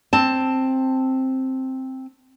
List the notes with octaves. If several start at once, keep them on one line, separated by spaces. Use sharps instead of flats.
C4 A5